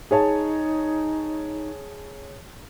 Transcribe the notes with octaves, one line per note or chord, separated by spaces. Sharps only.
D#4 G#4 C#5 A5